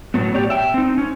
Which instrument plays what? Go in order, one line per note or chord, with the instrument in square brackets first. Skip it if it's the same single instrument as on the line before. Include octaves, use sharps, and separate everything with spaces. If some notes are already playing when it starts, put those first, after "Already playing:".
[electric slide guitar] A2 F#3 B3
G4 C#5 D5
E5 G5
C4 D#4
C#4